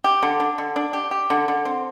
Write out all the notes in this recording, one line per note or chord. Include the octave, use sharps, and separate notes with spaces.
G4
D3
D4
D3
D4
G4
G4
D3
D3
C4